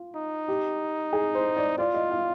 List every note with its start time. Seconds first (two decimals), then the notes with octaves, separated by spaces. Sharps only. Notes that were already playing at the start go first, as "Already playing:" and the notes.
Already playing: F4
0.15 D#4
0.48 G4
1.13 G#4
1.35 C5
1.57 D5
1.78 F4 D5
1.94 D#5
2.11 F5